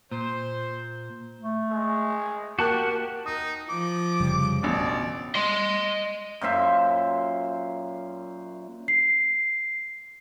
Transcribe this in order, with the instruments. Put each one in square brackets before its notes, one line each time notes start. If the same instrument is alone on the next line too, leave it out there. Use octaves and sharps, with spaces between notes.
[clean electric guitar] A#2 [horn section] C5
[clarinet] A3
[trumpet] G#3
[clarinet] A#3 [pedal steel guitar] F#4 A5 F#6 [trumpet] G4 [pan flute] A#4
[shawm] D#4 [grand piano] D#6
[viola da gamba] F3 [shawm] D6
[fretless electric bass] F1 C#3 G3
[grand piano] A1 B2 [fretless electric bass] B3 D4 [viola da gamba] D5
[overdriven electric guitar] D#5 C6
[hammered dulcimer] F#2 A#2 C5 E5
[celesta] C7